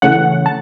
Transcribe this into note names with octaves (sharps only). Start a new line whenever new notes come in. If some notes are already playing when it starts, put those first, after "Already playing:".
C#3 E3 A3 C#4 F#5
A5